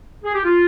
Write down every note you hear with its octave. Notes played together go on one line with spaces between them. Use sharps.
G#4
G4
F4